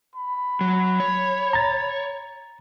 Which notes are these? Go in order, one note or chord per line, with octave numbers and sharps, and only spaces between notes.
B5
F#3
C#5
A#5 A6